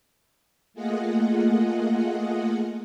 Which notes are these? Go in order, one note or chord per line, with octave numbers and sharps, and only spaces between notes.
A3 A#3 F4 G#4 D#5 F#5